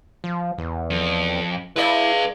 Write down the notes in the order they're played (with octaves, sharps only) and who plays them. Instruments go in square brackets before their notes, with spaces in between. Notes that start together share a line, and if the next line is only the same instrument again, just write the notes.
[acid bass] F3
E2
[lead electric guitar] F2
[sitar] G#3 D5 [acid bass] E4 [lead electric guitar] B4 F5